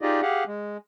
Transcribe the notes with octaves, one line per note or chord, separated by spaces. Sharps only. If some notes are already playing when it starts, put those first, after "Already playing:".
D#4 F4 G4 G#4 D5 D#5
G4 G#4 F5 F#5
G#3